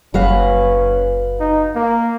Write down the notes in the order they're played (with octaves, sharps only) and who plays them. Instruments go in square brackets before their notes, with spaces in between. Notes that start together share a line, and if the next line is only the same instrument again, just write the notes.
[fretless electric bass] F#1 [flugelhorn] C#4 [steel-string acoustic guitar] F#4 B4 F5
[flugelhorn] D#4
A#3